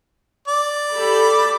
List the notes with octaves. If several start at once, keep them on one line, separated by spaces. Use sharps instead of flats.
D5
G4 A4 B5